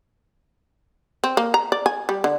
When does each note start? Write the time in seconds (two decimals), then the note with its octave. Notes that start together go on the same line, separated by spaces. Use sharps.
1.24 C4
1.37 A#3
1.54 A#5
1.72 D5
1.86 G#5
2.09 G3
2.24 D3